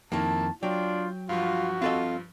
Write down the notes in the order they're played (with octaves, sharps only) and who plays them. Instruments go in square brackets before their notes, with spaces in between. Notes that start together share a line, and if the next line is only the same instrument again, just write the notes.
[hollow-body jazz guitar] F2 D#3 [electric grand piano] A#3 E4 [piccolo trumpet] A5
[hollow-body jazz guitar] F#3 [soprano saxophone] D4 [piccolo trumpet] F4 [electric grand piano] G5
[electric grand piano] G2 F3 [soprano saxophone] F4 [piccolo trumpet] F#4
[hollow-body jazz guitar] C4 A4 D#5 [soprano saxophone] F4